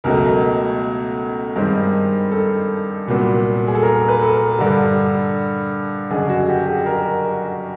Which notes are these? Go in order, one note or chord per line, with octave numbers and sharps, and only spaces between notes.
C#2 B2 F#3 A3 A#4
G2 D#3 G#3 C4
A4
C2 A#2 F#3 B3
G#4
A4
A#4
B4
A4
A#4
G2 D3 G3 A4
F#1 F#2 D3 G#4
F#4
G4
G#4
A#4